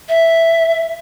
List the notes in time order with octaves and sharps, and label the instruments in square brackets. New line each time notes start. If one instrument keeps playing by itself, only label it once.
[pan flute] E5